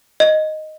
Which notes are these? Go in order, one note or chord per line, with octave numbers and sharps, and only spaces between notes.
D#5